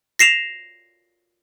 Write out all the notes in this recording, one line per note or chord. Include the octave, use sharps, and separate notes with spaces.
A#6 C7 E7 F7